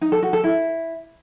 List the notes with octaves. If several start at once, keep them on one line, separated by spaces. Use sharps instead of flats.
D#4
A4
F#4
A4
E4